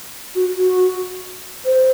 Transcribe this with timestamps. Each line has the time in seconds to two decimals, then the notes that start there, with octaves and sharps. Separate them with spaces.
0.35 F#4
0.57 F#4
1.66 C5